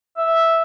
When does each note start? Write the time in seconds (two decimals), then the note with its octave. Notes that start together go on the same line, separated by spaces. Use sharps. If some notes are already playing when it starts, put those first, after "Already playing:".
0.17 E5